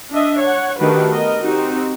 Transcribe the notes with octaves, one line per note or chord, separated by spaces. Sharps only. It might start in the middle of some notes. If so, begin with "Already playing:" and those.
D4 D#5 E5
C#5 F#5
D#3 A3 D4 F#4 G4 B4
B3 A#4 D#5
C4 D#4 F#4 G4